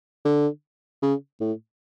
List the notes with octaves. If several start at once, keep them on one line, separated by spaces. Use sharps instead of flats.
D3
C#3
A2